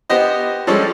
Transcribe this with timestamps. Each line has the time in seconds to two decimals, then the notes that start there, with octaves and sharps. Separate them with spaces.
0.10 B3 G4 C5 D#5
0.67 F3 G3 G#3 C#4 A4